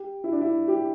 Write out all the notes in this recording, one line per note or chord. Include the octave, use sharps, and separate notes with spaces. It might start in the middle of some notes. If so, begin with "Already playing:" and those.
Already playing: G4
E4
D4
E4
G4